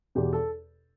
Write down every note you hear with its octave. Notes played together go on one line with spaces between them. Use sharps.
E2 B2 G4
A4